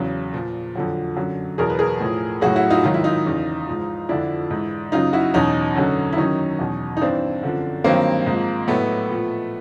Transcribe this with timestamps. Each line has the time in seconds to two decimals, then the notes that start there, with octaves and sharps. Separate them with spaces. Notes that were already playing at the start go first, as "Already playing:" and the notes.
Already playing: E2 C#3 F#3
0.33 A#2 F3
0.75 F2 D3 F#3
1.16 F#2 D3 F#3
1.58 E2 B2 F#3 G#4 A#4
1.70 B4
1.79 G#4 A#4
2.00 A2 F3
2.41 A2 F#3 F#4 G#4
2.56 E4 F#4
2.70 D#4 F4
2.84 G#2 D#3 F#3 F4
2.94 E4
3.04 D#4 F4
3.25 E2 C#3 E3
3.67 G#2 F3
4.09 F2 D3 F3 D4 E4
4.50 G#2 E3
4.92 F#2 C#3 F#3 D#4 F4
5.13 E4 F#4
5.34 E2 B2 F#3 C#4 D#4
5.76 F#2 D3 F#3
6.13 E4
6.17 F#2 D#3 F#3 C#4 D#4
6.59 E2 B2 F#3
6.97 D#4
7.01 G2 E3 C4 D4
7.42 F#2 D3 F3
7.84 G2 D#3 F#3 A#3 C4
8.26 G#2 F3
8.68 A2 F#3 A3 B3
9.11 A#2 F3